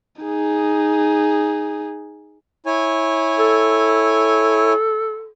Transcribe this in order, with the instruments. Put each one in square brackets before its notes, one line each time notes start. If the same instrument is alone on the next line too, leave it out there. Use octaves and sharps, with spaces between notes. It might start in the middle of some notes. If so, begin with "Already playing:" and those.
[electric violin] D#4 G#4
[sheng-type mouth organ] E4 C#5 G#5
[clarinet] A4